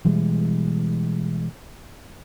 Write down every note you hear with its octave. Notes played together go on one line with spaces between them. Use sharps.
B2 E3 G3 G#3